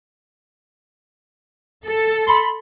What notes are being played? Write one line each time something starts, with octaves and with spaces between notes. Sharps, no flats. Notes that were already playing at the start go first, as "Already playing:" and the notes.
A4
B5 C6